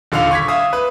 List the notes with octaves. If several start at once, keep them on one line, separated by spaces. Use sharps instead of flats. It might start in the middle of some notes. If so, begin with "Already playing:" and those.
D#1 D3 F5 D6 F7
C#6 G#6 B6
E5 F5 D#6
B4